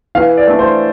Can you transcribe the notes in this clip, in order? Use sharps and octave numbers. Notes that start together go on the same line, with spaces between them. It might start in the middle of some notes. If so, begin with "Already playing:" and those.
E3 F5
D5
A3 D4
C5